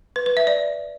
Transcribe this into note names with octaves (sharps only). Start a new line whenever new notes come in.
B4
B4
E5
D5